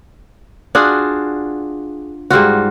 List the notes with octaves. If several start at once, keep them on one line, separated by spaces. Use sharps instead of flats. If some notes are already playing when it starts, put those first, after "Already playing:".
D4 F4 F#4 G#4
G#2 G3 F4 F#4